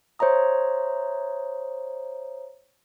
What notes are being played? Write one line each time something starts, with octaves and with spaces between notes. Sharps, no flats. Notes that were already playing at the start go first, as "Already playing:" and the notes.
C5 C#5 E5 A#5 D#6